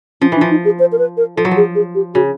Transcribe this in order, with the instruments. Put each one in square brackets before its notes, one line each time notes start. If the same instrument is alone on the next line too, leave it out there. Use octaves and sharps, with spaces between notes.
[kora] F3 [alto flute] C#4
[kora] E3 [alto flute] D4
[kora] F3
[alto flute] D#4
G#4
C5
A#4
B4
A#4
[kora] F3 [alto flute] A4
[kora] F#3
F3
[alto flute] G#4
G#4
G4
[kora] C#3 [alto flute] F#4